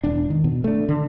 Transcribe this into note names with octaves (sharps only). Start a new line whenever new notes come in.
E1 D4
D#3
B2
A3 D4
D3